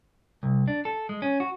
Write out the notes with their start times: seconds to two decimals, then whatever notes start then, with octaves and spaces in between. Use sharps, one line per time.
0.43 C2
0.68 D4
0.85 A4
1.09 G#3
1.22 C#4
1.40 F#4